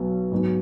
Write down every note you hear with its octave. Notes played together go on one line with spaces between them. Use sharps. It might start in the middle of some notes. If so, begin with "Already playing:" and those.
Already playing: B1 B2 F#3 B3
G#2 F#3 B3